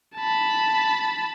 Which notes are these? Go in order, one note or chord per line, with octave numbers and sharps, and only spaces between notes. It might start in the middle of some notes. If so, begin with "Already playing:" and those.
A5 B5